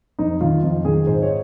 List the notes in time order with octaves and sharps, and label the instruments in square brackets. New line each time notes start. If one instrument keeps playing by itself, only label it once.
[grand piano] F2 D#4
D#3 F4
F2
D#3 G#4
G#2 C5
C#5